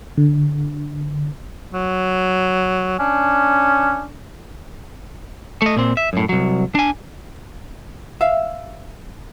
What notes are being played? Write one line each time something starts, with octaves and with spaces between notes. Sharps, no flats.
D3
F#3
C#4 D4
A3 D#5
A#2 C4
E5
F#2 A2
C2 F#3
D4 G#5
E5 F5